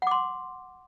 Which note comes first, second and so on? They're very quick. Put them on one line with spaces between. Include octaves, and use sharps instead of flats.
F#5 D6 C6